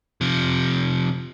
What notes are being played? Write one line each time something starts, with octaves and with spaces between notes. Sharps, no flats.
C3 F3